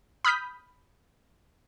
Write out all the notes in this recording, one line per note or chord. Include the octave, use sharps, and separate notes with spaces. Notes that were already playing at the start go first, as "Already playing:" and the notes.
B5 D#6 F6 G6 B6